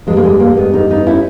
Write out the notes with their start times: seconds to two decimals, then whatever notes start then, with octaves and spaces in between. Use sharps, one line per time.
0.07 G2 G3 G#3
0.17 A#3
0.24 G#3
0.40 A#3
0.57 G#3 B3
0.73 B3 D#4
0.90 B3 D#4
1.06 C#4 E4